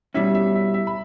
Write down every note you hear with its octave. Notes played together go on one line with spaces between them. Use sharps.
B2 G3 C#4 E4 E5
E5
E5
E5
B5